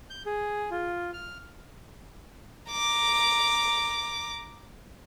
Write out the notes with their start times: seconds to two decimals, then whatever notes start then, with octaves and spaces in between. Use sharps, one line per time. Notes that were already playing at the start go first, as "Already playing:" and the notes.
0.10 G6
0.26 G#4
0.71 F4
1.13 F6
2.71 A#5 D6